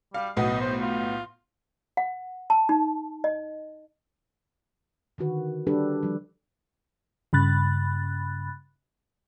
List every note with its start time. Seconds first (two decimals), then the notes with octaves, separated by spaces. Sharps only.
0.14 G3 F5
0.37 B1 A2 B3 D#5
0.61 C5
0.81 F4
1.97 F#5
2.50 A5
2.69 D#4
3.24 D#5
5.18 D3 D#3 F#4 B4
5.67 G3 D4 G4 A4 B4
6.03 F3 G3
7.33 G2 C#3 B5 F#6 A6